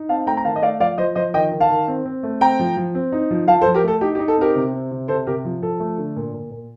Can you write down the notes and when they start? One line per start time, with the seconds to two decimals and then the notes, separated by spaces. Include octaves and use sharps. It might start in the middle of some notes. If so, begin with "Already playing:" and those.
Already playing: D#4
0.09 C4 F5 A5
0.27 A3 G5 A#5
0.37 A#5
0.45 D#3 F5 A5
0.56 D#5
0.62 A3 D5 F5
0.80 F3 D5 F5
0.98 F3 C5 D#5
1.15 F3 C5 D#5
1.34 D#3 D#5 G5
1.52 D#3
1.60 F5 A5
1.70 D#3
1.88 C4
2.05 C4
2.23 A3
2.41 C4 G5 A#5
2.59 F3
2.77 F3
2.95 C4
3.12 D#4
3.31 F3
3.48 F3 F5 A5
3.61 A4 C5
3.66 F3
3.74 G4 A#4
3.84 A3 A4
4.01 D#4 G4
4.15 G4
4.19 D#4
4.28 A4
4.37 C4 G4 A#4
4.55 C3
4.73 C4
4.91 C3
5.08 C3 A4 C5
5.27 C3 G4 A#4
5.45 F3
5.62 F3 A4
5.80 A3
5.98 D3
6.16 A#2
6.33 A#2
6.51 A#2